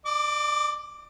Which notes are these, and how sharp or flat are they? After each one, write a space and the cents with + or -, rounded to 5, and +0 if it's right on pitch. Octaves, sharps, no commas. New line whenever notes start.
D5 +35 D6 +0